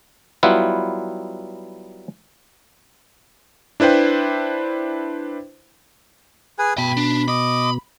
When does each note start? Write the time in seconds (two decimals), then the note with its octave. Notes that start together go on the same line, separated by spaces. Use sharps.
0.43 F#3 G3 B3 E4 F4 B4
3.80 D4 E4 B4 C5 G5
6.59 G#4 B4 G#5
6.78 B2 G5 A5 B5
6.97 D4
7.28 D#5 B5 D6